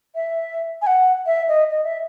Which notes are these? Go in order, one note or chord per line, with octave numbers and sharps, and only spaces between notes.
E5
G#5
F#5
E5
D#5
D#5
E5